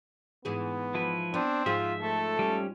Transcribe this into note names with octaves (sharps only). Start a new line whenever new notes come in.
G#2 E3 B3 G#4
F3 E4 B4
B3 C4 D4
G#2 F3 F4 G#4 E5
A3 A4
G3 C#4